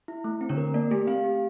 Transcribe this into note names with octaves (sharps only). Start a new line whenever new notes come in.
E4
A3
C4
D3 D4
A#4
A#3 D5
A3 G4
C4 F5
G4